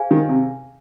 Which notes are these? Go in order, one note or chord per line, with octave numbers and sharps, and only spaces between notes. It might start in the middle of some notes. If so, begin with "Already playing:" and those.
Already playing: G#4 C5 F5 G#5
D#3
C3